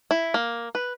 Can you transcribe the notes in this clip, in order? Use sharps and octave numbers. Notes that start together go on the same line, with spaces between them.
E4
A#3
B4